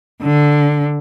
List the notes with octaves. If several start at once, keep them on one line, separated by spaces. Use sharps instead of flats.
D3